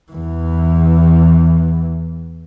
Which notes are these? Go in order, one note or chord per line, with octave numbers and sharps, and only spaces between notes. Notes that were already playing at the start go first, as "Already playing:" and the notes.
E2 E3